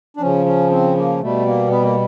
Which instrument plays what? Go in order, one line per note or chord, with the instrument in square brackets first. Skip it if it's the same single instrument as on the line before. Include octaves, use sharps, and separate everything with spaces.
[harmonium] D4
C#3 F3 C#4
C#4
C4
A#3
B2 G3 A3
A#3
B3
A#3